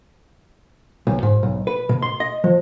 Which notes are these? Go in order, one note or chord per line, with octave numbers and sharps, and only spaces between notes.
B1
G#2
B1
B4
B2
C6
D#5
F3